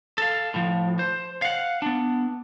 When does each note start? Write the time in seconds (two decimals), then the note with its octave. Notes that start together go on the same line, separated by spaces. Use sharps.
0.18 A4 F5
0.54 A2 F3
0.99 C5
1.42 F5 F#5
1.82 B3 D4